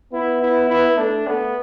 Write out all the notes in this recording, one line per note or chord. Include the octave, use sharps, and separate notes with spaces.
B3 E4
E4
E4
A3 D4
A3 B3